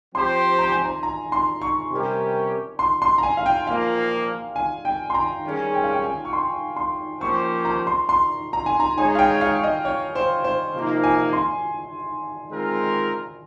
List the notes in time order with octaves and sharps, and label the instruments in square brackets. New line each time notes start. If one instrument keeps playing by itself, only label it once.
[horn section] F3 C4 G4 C5 [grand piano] C6
[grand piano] A#5
G#5
A#5
A#5
C6
C#6
[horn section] C3 G3 C#4 G4 A#4
[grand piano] C6
C6
A#5
G#5
F5
G5
[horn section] A#2 F3 A#3 [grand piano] F5
[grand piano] G#5
G5
C6
A#5
[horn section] D#3 G3 C#4 G#4
[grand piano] G5
F5
G5
G#5
C#6
C6
C6
[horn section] F3 A#3 C#4 G4 C5 [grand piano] C#6
[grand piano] A#5
C6
C6
A#5
G#5
A#5
[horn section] G#3 D#4 G#4 C#5 [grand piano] G#5
[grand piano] F5
G5
F5
D#5
C#5
C5
C5
[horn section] C3 F3 A#3 D#4
[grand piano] G#5
C6
[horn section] D#3 G#3 C4 F4 A#4